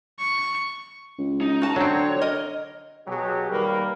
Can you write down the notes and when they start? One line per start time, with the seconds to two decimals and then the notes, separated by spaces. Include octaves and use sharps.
0.19 C#6
1.18 C#2
1.41 D#4
1.62 F#4 A5
1.76 D3 F#3 C4 C#5
2.22 A#4 D#5
3.07 B2 F#3 G4 G#4
3.51 D#3 G3 A#3 A#4 B4